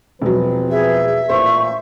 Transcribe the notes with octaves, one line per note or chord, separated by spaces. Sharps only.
E1 F3 F#3 C4 B4
G#4 E5
A1 A#2 C5 C#6